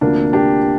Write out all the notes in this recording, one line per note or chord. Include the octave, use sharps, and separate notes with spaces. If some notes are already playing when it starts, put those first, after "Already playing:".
D2 C3 F3 A#3 D4
D4 G4